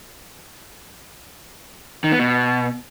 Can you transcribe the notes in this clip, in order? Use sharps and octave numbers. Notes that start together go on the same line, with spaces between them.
D#3
B3
B2